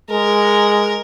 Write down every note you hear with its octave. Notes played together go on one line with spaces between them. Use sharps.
G#3 A#4